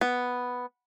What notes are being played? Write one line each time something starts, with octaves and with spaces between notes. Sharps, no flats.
B3